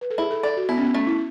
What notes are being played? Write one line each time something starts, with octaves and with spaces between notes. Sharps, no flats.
B4
A4
E4 G#4
A4
A4 D5
F#4
B3 E4
C#4
B3
A3 C#4
E4